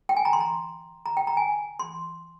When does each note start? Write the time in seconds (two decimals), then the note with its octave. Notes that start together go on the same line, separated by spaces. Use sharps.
0.09 G5
0.17 G#5
0.25 A#5
0.33 C6
0.40 A#5
1.06 A#5
1.17 G5
1.27 A#5
1.37 G#5
1.79 C6